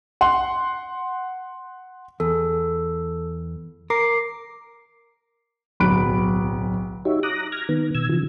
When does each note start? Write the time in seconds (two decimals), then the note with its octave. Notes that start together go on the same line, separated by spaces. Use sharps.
0.21 F#5 C6
2.20 E2 A4
3.90 A#4 D6 C7
5.80 D1 B1 B5 F#6 D7
7.05 D#4 F#4 G4 C#5 E5
7.23 A#5 D6 D#6 F#6 A#6
7.52 F6 G#6 A#6
7.69 D#3 B3
7.95 B2 E6 G#6
8.09 C#3 E3 F3